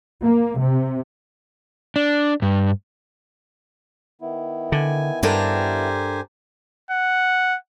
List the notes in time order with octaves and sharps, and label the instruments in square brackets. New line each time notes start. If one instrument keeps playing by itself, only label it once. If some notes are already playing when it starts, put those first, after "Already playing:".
[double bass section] A#3
C3
[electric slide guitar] D4
G2
[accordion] D#3 B3 E4
[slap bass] D3 [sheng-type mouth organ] G#5
[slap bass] G2 [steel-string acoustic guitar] D4 A4 A#4 [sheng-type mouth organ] G4 C5 G#5
[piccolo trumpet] F#5